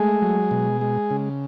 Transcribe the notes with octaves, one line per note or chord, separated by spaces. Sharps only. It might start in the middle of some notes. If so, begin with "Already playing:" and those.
Already playing: G#3 A3 G#4
F#3
B2
G#3
C#3